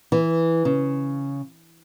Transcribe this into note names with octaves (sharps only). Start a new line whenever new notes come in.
E3
C#3